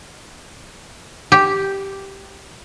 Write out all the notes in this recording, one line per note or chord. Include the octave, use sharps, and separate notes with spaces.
G4